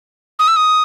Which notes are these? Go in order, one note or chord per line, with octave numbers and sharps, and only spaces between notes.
D#6
E6
D#6